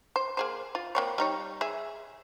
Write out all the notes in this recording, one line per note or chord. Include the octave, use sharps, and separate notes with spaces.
C5
A#3 G#4 C5
F4
A#3 C4 C#5
G3 D#4 C#5
G#4 E5